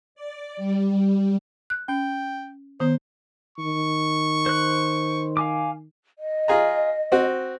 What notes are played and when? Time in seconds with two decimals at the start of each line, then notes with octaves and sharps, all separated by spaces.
0.15 D5
0.57 G3
1.70 F#6
1.88 C#4 G5
2.80 D#3 B3 C5
3.58 D#3 C#6
4.46 C5 F#6
5.37 F5 G#5 D6
6.19 D#5
6.48 F4 G#4 A#5
7.12 C4 F#4